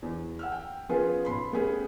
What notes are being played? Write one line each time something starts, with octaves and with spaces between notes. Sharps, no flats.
E2
F#5 E6 F6
G5
F3 B3 C#4 F4 G#4 B4
B1 B5 C6
A3 B3 C#4 G4 G#4 B4